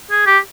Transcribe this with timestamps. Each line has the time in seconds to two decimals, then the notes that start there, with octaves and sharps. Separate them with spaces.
0.11 G#4
0.27 G4